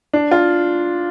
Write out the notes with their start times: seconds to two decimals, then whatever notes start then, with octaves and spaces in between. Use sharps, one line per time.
0.13 D4
0.31 F4